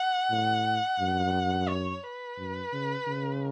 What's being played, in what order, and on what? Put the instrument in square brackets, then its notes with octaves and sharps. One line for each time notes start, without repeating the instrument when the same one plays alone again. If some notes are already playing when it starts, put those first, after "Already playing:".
Already playing: [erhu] F#5
[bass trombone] A2
F#2
[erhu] C#5
B4
[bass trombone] F#2
C#3
C#3